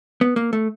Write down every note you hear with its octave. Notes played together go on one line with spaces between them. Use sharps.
B3
A#3
A3